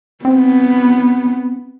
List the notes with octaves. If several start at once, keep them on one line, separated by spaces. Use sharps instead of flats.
B3 C4